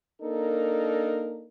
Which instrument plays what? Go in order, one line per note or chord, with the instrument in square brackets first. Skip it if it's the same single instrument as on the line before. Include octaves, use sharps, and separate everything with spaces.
[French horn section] A#3 D4 D#4 A4 A#4